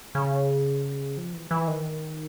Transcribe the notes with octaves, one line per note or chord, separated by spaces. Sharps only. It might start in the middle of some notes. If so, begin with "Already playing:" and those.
C#3
F3
E3
E3
D#3